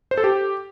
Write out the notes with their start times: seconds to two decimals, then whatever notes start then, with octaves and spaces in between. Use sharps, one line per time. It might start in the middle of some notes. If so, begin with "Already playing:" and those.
0.11 C5
0.18 A4
0.24 G4